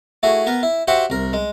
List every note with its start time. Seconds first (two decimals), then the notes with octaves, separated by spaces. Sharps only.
0.23 A3 E4 F#4 G#4
0.47 B3 A#4 B4
0.63 E4
0.88 F#4 G4 C5 E5 F#5 G5
1.10 C2 A#4
1.33 G#3